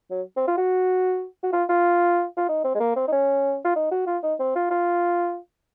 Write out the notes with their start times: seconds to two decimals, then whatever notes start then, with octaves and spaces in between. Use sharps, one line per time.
0.11 F#3
0.37 C4
0.47 F4
0.58 F#4
1.43 F#4
1.53 F4
1.69 F4
2.37 F4
2.49 D#4
2.64 C4
2.75 G#3
2.80 A#3
2.96 C4
3.08 D#4
3.12 C#4
3.65 F4
3.76 D#4
3.91 F#4
4.07 F4
4.23 D#4
4.40 C4
4.55 F4
4.71 F4